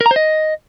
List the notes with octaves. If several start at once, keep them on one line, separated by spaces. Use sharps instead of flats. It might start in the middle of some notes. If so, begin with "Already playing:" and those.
A#4
A#5
C5
D#5